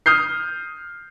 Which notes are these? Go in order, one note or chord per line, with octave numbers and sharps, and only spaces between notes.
D#6 F6 G6 C7